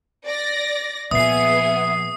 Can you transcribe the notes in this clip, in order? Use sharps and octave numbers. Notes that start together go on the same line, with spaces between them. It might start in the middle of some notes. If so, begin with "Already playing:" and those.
D5 A#6
A#2 F3 B3 G#4 E5 D#6 C7